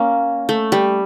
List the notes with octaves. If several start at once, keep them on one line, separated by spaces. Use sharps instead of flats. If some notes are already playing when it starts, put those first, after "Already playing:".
Already playing: A#3 C#4
A3
G3